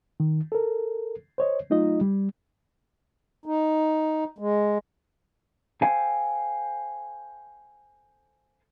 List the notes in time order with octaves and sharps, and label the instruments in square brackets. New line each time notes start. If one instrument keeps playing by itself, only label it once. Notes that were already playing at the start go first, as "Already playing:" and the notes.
[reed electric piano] D#3
A4 A#4
C5 C#5 D#5
F#3 A3 D#4 F4 D#5
G3
[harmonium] D#4
G#3
[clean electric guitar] A4 C5 F5 G5 G#5